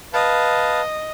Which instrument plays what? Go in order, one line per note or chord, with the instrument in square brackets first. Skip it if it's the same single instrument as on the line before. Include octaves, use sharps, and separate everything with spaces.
[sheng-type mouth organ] B4 F5 A5 [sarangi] D#5